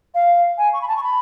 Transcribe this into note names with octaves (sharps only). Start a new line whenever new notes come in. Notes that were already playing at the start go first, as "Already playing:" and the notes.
F5
G#5
C#6
B5
A5
C#6
B5